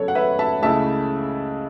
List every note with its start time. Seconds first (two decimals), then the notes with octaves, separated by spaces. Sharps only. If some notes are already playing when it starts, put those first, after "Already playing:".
Already playing: C#3 F#3 B3 A4 C#5
0.08 F#5
0.15 B4 E5
0.39 E5 A5
0.62 C#2 C#3 A3 E4 E5 A5